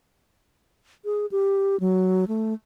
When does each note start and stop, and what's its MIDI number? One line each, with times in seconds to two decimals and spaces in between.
1.05 1.26 68
1.31 1.79 67
1.80 2.25 54
2.28 2.54 57